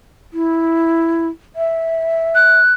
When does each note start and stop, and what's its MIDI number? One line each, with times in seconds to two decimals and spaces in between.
0.33 1.27 64
1.55 2.59 76
2.35 2.73 90